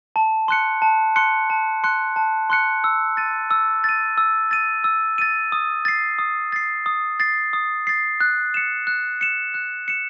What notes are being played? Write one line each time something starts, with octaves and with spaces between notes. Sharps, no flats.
A5
C6 F#6 C#7
A5
C6 F#6 C#7
A5
C6 F#6 C#7
A5
C6 F#6 C#7
E6
A6 D#7
E6
A6 D#7
E6
A6 D#7
E6
A6 D#7
D#6
A6 C7
D#6
A6 C7
D#6
A6 C7
D#6
A6 C7
F#6
C#7 E7
F#6
C#7 E7
F#6
C#7 E7